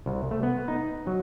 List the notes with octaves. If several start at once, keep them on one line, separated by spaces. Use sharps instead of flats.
C2
A3
B3
D#4
F#3